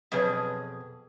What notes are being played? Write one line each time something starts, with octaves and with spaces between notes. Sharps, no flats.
F2 B2 F#3 G#4 B4 C#5